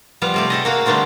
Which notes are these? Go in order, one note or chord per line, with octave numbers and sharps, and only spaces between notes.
F3 G3 B3 F5
C3 A3 G4
G#4 A4 D#5
A#3 F#4 F5
D3 G3 A3 B3 C4 D4